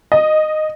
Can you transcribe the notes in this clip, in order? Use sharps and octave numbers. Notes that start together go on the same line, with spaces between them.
D#5